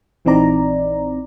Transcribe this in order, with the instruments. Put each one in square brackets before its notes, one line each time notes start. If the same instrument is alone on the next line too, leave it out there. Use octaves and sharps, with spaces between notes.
[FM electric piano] A#1 E3 C4 D#4 D5 A#5